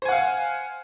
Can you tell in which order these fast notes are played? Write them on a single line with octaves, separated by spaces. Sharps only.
C5 G#5 F#5 F5